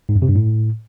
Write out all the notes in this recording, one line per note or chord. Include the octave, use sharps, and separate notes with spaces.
G#2
F#2
C3
G2
A2